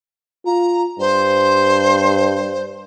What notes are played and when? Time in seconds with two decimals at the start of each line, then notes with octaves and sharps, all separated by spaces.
0.45 F4 A#5
0.99 G2 C5